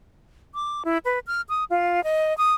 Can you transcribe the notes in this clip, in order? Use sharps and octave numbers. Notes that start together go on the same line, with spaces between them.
D6
E4
B4
F6
D#6
F4
D#5
D#6